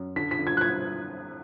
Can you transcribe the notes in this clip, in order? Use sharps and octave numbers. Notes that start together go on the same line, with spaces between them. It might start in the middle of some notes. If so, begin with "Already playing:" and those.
Already playing: F#2
D3 B6
B6
D3
G#6
F#6
G#6